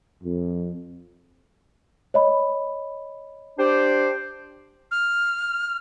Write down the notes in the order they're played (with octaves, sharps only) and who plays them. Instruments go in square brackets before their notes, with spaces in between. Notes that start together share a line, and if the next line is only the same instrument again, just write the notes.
[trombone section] F2
[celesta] C#5 D#5 B5
[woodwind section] D4 G4 C5
[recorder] F6